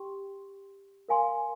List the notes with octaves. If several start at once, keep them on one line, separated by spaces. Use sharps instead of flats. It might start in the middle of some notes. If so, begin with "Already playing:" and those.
Already playing: G4 G5 C6
A#4 F5 G#5 C6